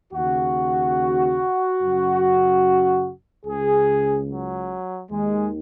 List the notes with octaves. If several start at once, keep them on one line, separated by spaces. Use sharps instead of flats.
D#2 C#3 F#4
F#2 C#3
C#2 C#3 G#4
F#3
D#2 D#3 G#3